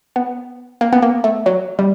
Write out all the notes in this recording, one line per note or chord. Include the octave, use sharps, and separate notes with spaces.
B3
A#3
B3
A#3
A3
F#3
G3